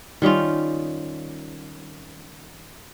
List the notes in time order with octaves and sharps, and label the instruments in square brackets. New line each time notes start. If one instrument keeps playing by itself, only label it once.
[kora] D#3 G3 C#4 F4